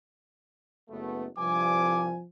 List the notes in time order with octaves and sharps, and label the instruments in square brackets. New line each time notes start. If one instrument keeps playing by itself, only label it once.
[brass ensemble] F#1 A3 B3
[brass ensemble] C2 G2 G#5 [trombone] F3 [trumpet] D6